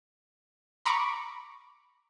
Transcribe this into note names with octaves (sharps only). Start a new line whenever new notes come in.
A#5 B5 C#6 D6